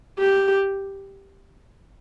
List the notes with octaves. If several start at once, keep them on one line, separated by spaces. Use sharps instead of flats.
G4